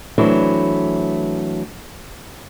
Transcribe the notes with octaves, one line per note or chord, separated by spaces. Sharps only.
E3 F#3 A3 C4 D4 E4